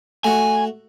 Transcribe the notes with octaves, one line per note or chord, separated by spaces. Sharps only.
A3 F#4 G#5